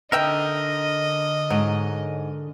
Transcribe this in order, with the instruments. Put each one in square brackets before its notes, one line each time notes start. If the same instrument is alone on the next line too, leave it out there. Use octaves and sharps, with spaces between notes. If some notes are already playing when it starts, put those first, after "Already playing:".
[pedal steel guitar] D3 A#4 [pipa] D#3 E5 G5 [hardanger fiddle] D#5
[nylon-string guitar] G#2 [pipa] F#3